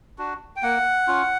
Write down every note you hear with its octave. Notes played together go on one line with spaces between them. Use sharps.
D4 F#4
G5
A#3 F#5
C#4 F4